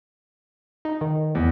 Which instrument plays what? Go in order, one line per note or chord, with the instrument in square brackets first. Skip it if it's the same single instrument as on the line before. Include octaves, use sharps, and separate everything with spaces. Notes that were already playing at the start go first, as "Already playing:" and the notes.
[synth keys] D#4
D#3
[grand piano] E2